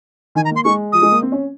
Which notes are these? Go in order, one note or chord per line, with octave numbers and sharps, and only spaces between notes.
D#3 G#5
A#5
A#3 C6
G#3 C#6
F3 D#6
G#3
A#3
C4
C#4